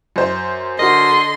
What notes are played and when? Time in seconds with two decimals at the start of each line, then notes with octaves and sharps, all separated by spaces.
0.16 F#2 C5
0.79 D3 F#4 A#4 D#5 C6